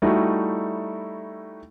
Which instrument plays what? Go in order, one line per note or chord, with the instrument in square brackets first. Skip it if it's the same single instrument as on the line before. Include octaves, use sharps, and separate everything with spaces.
[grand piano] G3 A3 D#4 E4 F#4